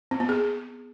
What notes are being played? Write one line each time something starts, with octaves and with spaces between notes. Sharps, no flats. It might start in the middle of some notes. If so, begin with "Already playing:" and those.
C4
B3
G#4